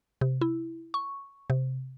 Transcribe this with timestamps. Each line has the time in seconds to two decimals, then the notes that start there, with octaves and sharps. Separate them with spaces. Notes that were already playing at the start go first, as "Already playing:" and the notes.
0.21 C3
0.41 E4
0.94 C#6
1.50 C3